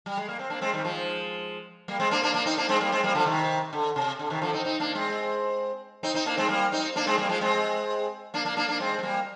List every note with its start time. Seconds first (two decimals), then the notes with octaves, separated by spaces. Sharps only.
0.06 G3
0.17 G#3
0.29 A#3
0.39 C4
0.50 A#3 D4
0.62 G#3 C4
0.73 D#3 G3
0.84 F3 G#3
1.88 G3 A#3
2.00 G#3 C4
2.11 A#3 D4
2.23 A#3 D4
2.34 A#3 D4
2.46 C4 D#4
2.57 A#3 D4
2.69 G#3 C4
2.81 G3 A#3
2.92 G#3 C4
3.04 G3 A#3
3.15 D3 F3
3.26 C3 D#3
3.73 D3
3.96 C3
4.19 D3
4.30 C3 D#3
4.42 D3 F3
4.53 C4 D#4
4.65 C4 D#4
4.80 A#3 D4
4.95 G#3 C4
6.03 C4 D#4
6.14 C4 D#4
6.26 A#3 D4
6.38 G#3 C4
6.49 G3 A#3
6.72 C4 D#4
6.96 A#3 D4
7.07 G#3 C4
7.18 G3 A#3
7.29 F3 G#3
7.41 G#3 C4
8.34 A#3 D4
8.45 A#3 D4
8.57 A#3 D4
8.68 A#3 D4
8.80 G#3 C4
8.99 G#3
9.03 G3 A#3